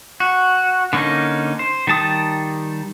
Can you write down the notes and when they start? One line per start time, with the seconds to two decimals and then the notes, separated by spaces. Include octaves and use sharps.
0.20 F#4
0.93 D3 A#3 C#4 D#4
1.59 C5
1.87 D#3 G3 A5 D#6